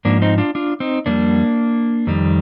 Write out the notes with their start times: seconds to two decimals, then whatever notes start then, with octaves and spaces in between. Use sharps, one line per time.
0.05 G#2 F3 A#3 D4
0.22 C4 D#4
0.38 D4 F4
0.55 D4 F4
0.80 C4 D#4
1.06 F2 D3 G3 A#3 D4
2.07 F2 D#3 G3